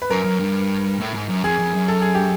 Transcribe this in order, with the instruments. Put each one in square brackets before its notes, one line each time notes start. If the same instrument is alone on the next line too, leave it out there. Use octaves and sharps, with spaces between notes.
[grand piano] B4
[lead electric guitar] F#2 [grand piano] A#4
[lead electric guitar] F#2
G2
A2
G#2
F#2
[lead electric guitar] F2 [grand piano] G#4
[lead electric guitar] F2
F#2
[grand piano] A4
G#4
G4